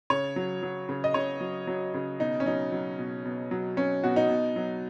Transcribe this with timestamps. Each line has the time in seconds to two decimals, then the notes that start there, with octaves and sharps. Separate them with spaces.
0.10 C#3 C#5
0.36 F#3
0.62 F#3
0.89 C#3
1.04 D#5
1.14 C#3 C#5
1.41 F#3
1.67 F#3
1.94 C#3
2.20 B2 D#4
2.40 C#4
2.46 F#3 D#4
2.72 F#3
2.99 B2
3.25 B2
3.51 F#3
3.77 F#3 C#4
4.04 B2 F#4
4.16 D#4
4.29 B2
4.56 F#3